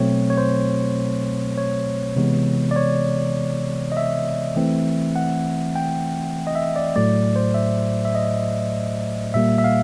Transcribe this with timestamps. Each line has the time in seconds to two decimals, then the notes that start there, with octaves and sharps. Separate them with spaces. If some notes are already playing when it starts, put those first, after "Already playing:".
Already playing: B2 F#3 A3 C4 C#5
0.30 C#5
0.38 C5
1.58 C#5
2.16 C3 E3 G#3 B3
2.71 D5
2.76 C#5
3.92 D#5
3.97 E5
4.56 E3 A3 C4
5.16 F#5
5.76 G5
6.47 D#5
6.55 E5
6.76 D5
6.96 A2 F#3 A3 D5
7.36 C5
7.54 E5
8.05 E5
8.15 D#5
9.34 A#2 G3 A#3 E5
9.58 E5
9.64 F5